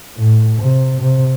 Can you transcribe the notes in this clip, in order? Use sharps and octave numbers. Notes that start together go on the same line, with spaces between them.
A2
C3
C3